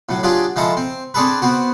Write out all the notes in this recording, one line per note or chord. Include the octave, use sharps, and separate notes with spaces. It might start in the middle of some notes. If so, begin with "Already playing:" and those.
A2 F#3
F#3 D4 F4 G4 G#4
F3 G#3 E4 A4 A#5
C4
C4 D4 G#4 A4 B4
B3 C4 F#4